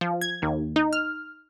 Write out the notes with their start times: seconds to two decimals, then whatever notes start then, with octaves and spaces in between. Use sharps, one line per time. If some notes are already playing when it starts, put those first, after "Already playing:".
0.01 F3
0.21 G#6
0.42 D#2
0.76 D#4
0.93 F6